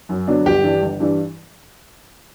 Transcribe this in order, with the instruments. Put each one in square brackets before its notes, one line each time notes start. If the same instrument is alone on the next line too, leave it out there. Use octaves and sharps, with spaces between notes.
[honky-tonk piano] F#2
D3 F#3 B3 D4
[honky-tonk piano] G1 [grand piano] G4
[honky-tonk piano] G2 E3 G3 D4
G1
G2 E3 G3 D4